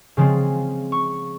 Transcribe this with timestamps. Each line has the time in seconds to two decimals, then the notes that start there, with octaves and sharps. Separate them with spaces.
0.17 C#3 F3 G#3 C4
0.92 C#6